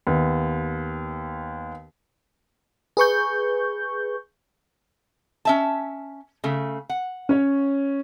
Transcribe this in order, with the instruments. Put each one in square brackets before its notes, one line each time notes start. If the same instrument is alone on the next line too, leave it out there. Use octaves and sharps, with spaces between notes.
[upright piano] D#2 B3
[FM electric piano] G#4 B4 C#6 G6
[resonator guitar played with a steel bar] C#4 E5 A5
C#3 A3
F#5
[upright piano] C#4 C#5